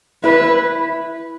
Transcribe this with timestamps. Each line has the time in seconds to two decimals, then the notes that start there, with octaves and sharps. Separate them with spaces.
0.24 E4 B4